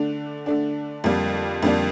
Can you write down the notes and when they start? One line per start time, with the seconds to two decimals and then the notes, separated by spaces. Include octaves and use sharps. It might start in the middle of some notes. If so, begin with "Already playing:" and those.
Already playing: D3 A3 D4
0.46 D3 A3 D4
1.04 F2 D3 G3 A#3 D4
1.62 F2 D3 G3 A#3 D4